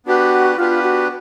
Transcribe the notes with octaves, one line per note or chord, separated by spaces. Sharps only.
B3 D4 F#4 G4 B4
B3 D4 F4 G4 B4
F#4